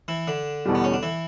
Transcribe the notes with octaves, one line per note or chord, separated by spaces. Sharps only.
E3 E4
D3 D4
E2 B2 G3
B3
C#4
D4
E3 E4